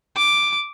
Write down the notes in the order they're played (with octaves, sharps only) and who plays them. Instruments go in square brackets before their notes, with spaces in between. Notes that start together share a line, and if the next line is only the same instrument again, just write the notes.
[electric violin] D6